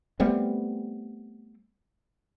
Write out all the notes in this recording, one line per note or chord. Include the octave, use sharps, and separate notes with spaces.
G3 A3 B3 C4